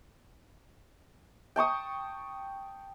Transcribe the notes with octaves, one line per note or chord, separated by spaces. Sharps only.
G5 A5 C#6 D#6